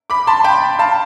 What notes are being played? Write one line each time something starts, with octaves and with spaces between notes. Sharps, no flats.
B5 D6
A5 C6
G5 B5
F5 A5